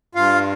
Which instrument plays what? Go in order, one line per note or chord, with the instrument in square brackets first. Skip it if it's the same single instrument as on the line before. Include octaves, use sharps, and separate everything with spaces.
[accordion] G2 F4 F5